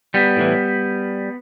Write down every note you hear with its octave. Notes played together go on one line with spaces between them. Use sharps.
G3 B3
A2 E3